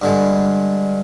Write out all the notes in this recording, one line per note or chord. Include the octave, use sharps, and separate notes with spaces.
G2 D3 G#3